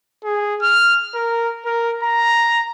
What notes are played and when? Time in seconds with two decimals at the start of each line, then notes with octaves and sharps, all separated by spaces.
0.24 G#4
0.62 F6
1.15 A#4
1.66 A#4
2.03 A#5